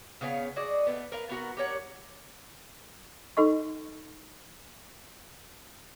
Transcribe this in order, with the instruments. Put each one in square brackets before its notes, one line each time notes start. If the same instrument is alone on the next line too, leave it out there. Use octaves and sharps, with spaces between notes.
[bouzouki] C#3 B3 C#5 F5
F#4 G#4 D5 D#5
A2 B3
A#4 B4 F5
B3 F#4 A#4
G4 A#4 C#5 F#5
[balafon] D#4 A4 D#5 C#6